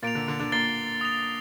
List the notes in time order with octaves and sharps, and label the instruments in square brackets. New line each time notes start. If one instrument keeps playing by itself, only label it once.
[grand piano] A#2 A#3 [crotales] A6 D7 F7
[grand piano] D3 D4
D3 D4
D3 D4
[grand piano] A#2 A#3 [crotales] A6 C7 G7
[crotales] D#6 A#6 F7